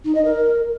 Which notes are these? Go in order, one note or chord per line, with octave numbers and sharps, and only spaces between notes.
D#4
D#5
A#4